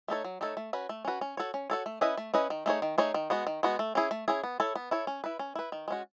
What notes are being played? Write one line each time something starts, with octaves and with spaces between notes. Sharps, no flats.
A3 D#4 A4 C#5
F#3
A3 D#4 A4 C#5
A3
C#4 F#4 B4
A3
C#4 F#4 B4
C#4
F#4 A4 C#5
C#4
F#4 A4 C#5
A3
C#4 E4 B4 D#5
A3
C#4 E4 B4 D#5
D#3
A3 D#4 G#4 C#5
D#3
A3 D#4 G#4 C#5
D#3
G#3 B3 F#4
D#3
G#3 B3 F#4
A3
C#4 E4 G#4
A3
C#4 E4 G#4
B3
E4 A4 C#5
B3
E4 A4 C#5
C#4
E4 B4
C#4
E4 B4
D#3
G#3 C#4 F#4